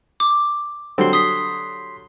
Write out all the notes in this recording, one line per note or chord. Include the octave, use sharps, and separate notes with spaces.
D6
D3 F#3 G3 C4 C6
C6 D#6 B6